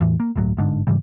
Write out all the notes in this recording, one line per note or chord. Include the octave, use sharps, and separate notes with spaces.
E2 A2 E3
A#3
G1 C#2 A2 F#3
G1 G#2 D3
G#2 C#3 E3 G3